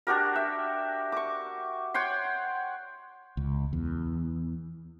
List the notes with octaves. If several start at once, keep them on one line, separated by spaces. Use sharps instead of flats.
D4 F#4 G4 A#4
E5
C#6 D6
C#5 F#5 G5 C6
C#2
E2